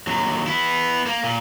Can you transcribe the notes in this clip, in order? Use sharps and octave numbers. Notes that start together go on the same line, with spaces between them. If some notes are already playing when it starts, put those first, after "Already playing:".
D#2 F#3
B3 E4
A#3
A#2